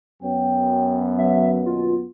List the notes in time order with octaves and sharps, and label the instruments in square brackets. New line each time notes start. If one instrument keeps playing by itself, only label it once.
[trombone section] F#2 B3 [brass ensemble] C#5 G5
[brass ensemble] D2 F#3 [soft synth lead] E5
[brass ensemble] D#2 B2 [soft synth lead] F4